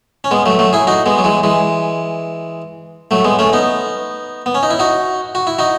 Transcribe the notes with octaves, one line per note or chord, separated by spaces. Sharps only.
C#4
G#3 B3
F#3 A3
F#3 A3
E4 G#4
D#4 F#4
G#3 B3
F#3
E3 G#3
E3 G#3
F#3 A3
G#3 B3
A3 C#4
B3 D#4
B3
C#4
D#4
E4
D#4 F#4
F#4
E4
D#4 F#4